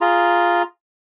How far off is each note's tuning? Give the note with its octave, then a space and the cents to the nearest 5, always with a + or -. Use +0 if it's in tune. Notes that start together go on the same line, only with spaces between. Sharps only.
F4 +0 G#4 +0 A#5 +0